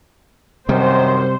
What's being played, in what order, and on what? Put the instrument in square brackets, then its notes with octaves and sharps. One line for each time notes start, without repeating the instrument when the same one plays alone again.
[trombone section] F#2 D#3 [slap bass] C3 G3 [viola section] C5